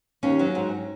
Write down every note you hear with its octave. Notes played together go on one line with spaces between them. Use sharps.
D#2 C#4
F#3
G#2